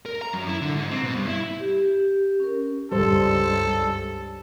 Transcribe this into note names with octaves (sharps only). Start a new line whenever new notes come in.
A#4
A#5
F#2
E4
D3
G#2
C4
B2
G2
E4
G4
C#4 A#4
C#2 G2 G3 A4 C5